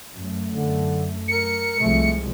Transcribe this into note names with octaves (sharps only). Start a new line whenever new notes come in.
F#2 A3
D3
A#4 C#7
C2 F3 G#3 A3